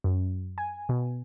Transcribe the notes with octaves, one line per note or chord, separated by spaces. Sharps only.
F#2
G#5
B2